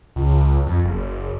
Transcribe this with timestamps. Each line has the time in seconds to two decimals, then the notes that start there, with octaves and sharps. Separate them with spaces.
0.16 C#2
0.66 F2
0.85 F#1